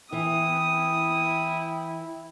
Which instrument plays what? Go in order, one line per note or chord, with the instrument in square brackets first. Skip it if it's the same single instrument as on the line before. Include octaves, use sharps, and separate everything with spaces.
[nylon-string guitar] E3 [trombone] E4 [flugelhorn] G5 [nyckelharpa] D#6